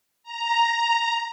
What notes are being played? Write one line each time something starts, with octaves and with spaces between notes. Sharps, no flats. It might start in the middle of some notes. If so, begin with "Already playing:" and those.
A#5